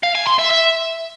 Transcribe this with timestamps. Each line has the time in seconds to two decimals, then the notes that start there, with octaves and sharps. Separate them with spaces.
0.03 F5
0.15 G#5
0.27 C6
0.39 E5
0.51 E5